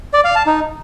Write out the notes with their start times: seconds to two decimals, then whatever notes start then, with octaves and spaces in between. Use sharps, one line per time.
0.14 D5
0.25 F5
0.35 A5
0.46 D#4